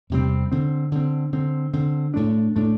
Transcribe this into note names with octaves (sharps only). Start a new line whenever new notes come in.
E2 C3 G3 C4
D3 C4
D3 C4
D3 C4
D3 C4
A2 A3 D4
A2 A3 D4